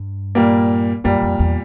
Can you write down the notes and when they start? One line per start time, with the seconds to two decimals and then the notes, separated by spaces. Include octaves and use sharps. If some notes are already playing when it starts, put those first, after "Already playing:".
Already playing: G2
0.35 A#2 G3 A#3
1.04 F#2 A#2 G3 A#3
1.21 F2
1.39 E2